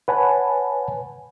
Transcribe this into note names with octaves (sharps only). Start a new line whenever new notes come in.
B4 C#5 F#5 G#5 A5 B5